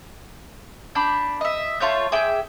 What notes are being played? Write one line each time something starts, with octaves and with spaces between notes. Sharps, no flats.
D4 B5 G6
D#5 E5
A3 F4 C#5 G6
G#4 E5 G5 D6